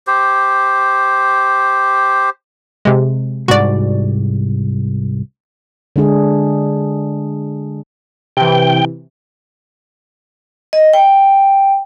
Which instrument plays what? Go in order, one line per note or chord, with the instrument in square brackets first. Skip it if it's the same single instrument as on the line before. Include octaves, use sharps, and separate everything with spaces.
[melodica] G4 C5
[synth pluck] C3 G#3
[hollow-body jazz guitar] C2 G#2 [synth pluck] F#4 D5
[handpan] D3 G#3 D4 G#4
[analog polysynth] C3 E3 [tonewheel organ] G5
[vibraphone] D#5
G5